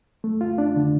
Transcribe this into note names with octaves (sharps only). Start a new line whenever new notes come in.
A3
F4
D4
D3